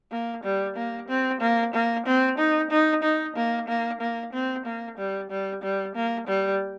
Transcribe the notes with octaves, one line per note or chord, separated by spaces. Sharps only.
A#3
G3
A#3
C4
A#3
A#3
C4
D#4
D#4
D#4
A#3
A#3
A#3
C4
A#3
G3
G3
G3
A#3
G3